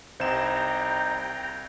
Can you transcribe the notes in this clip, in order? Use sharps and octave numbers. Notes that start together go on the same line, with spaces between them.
C2 G3 D#4 C5 G5 A#5 E7